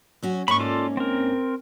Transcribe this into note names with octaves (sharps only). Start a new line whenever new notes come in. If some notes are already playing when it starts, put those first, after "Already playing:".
F#3 C#4 F#4
G#2 A#3 C#4 B5 C#6
F4 A4 D5
C4 A#4